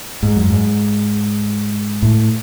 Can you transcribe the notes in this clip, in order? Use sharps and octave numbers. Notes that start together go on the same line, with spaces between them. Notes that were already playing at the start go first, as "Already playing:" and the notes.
G#2
F#2
G#2
A2